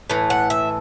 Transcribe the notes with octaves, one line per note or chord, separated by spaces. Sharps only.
A2 E3
F#5
E5